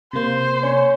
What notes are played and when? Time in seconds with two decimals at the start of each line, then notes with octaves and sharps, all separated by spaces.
0.13 C3 A#3 C5
0.63 C#4